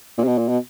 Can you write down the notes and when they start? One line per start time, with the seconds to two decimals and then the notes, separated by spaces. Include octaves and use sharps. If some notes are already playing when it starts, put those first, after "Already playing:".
0.18 A#2
0.24 C3
0.28 B2
0.38 A#2
0.49 B2